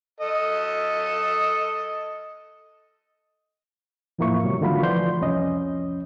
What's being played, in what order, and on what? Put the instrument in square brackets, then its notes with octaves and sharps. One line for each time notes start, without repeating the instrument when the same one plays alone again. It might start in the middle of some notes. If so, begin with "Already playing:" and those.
[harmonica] A4 D#5
[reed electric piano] E2 A2 F3 A#3 E4 C#6
G#2 C3 F#3 G3
D3 D#3 A3 F4 F#4 B5
E3 F3 D5 C6 G6
C2 F2 C#4 D#5